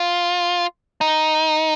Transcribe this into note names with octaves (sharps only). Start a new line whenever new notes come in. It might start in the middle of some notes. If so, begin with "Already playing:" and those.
Already playing: F4
D#4